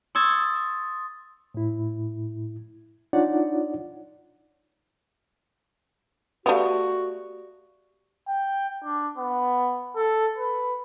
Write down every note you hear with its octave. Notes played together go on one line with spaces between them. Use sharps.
C6 C#6 D#6 E6 G#6 A6
A2 E4
D4 D#4 F4 C#5 D5 F#5
A3 B3 F#4 G4 D5 F5
G5
D4
B3
A4
B4